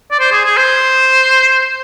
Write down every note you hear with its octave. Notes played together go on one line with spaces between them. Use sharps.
D5
C5
G#4
G#4
C5